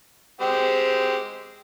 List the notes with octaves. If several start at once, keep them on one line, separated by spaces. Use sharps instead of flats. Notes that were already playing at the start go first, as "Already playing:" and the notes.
G#3 C4 G4